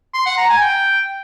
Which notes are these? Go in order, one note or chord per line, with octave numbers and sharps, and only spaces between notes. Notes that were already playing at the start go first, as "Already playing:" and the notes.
C6
F#5
A#5
G#5
G5